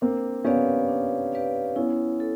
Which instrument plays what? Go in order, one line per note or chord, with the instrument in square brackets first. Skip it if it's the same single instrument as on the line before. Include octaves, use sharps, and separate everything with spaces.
[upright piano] A#3 C4 [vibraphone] D4
[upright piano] B3 C#4 [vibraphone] G4 B4 D5 F5
[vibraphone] D4
G4 B4 D5 F5
[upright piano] B3 C#4 [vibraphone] E4
[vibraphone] A4